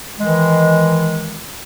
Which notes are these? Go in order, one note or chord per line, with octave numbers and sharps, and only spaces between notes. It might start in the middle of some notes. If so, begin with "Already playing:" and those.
D#3 E3 G#3